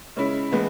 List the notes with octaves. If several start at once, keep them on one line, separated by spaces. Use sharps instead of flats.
C#3 G#3 C#4 E4
A2 E3 G#3 B3